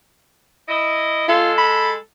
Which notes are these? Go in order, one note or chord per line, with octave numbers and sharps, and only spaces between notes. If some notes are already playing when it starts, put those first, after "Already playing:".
E4 D#5
G#3 F4 A4
B5